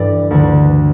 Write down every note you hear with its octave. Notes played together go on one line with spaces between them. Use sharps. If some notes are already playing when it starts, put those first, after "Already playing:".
Already playing: G2 E3 A4 D5
D2 D3